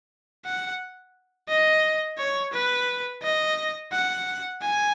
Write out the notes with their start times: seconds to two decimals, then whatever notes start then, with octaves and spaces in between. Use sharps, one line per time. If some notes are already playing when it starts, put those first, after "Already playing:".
0.46 F#5
1.49 D#5
2.18 C#5
2.53 B4
3.23 D#5
3.92 F#5
4.62 G#5